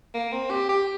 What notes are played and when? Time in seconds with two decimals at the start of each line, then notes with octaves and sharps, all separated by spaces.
0.14 A#3
0.32 C4
0.51 G4
0.69 G4